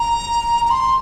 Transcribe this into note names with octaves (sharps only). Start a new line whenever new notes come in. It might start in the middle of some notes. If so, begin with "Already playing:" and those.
Already playing: A#5
A#5
C6